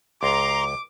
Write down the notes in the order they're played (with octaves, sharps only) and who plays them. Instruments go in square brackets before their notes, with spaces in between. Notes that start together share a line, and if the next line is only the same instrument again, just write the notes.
[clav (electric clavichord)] C#2 [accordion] A#5 C6 [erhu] D6